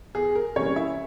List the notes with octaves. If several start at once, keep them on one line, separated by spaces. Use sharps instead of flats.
E2 G#4
A#4
C3 E3 G3 A#3 C#4 C#5
E4 E5